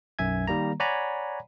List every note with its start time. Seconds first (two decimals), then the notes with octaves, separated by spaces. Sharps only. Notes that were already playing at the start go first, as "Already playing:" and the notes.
0.19 B1 F#2 E5 G#5 G#6
0.47 D#3 G3 A#3 A#5
0.80 C#5 D5 F#5 G#5 A#5 B5